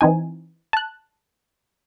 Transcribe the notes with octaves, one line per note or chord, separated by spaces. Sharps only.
E3 C4 D#4 G#5
A5 F#6